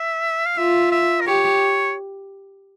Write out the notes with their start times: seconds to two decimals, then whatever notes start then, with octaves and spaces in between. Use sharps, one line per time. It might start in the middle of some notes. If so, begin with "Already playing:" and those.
Already playing: E5
0.46 F5
0.57 F4 E5
0.92 E5
1.21 A#4
1.27 G4 C#5